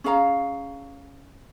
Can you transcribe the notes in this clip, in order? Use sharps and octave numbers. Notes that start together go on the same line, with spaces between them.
C#4 G#4 F5 A#5